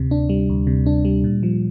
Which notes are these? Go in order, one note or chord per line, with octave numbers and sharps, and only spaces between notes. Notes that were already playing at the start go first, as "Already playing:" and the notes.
Already playing: D2 C3
D4
G3
D2
C3
D4
G3
A#2
F3